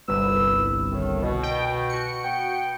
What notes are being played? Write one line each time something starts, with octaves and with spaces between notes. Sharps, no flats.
G1 C2 B4 E6
A2 D#3
B2
G5
F#4 C#7
B3 G5